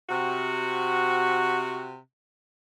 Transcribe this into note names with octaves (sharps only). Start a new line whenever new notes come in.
C3 F#4